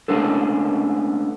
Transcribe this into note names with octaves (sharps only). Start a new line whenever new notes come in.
G#3 A3 B3 C#4 D4 A4